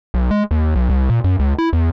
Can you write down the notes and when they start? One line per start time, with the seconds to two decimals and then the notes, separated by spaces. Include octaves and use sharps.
0.14 B1
0.31 G#3
0.51 D#2
0.75 B1
0.89 C2
1.10 A#2
1.24 F#2
1.39 C#2
1.58 E4
1.73 E2